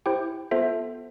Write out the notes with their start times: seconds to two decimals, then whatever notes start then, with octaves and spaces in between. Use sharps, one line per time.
0.06 E4 G4 C5 G5
0.51 B3 F4 A4 C5 E5